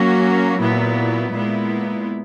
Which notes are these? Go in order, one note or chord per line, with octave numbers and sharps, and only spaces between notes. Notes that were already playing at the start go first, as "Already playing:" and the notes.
Already playing: F#3 A#3 C#4 F#4
A#2 F#3 B3 E4
A#2 G#3 B3 E4